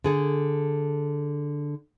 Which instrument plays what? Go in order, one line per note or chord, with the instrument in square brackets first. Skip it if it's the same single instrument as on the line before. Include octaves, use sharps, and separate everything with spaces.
[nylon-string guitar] D3 G#4 A4